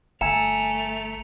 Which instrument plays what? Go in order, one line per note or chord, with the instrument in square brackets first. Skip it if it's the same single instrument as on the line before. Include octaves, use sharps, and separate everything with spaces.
[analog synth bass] G1 [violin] A3 F7 [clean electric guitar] E5 G#5 [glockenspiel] A#5 C#7 E7